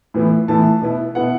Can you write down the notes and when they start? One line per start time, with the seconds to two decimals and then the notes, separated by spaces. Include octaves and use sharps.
0.14 A2 E3 B3 E4
0.48 A2 E3 B3 E4 A5
0.82 B2 B3 E4
1.15 B2 B3 E4 F#5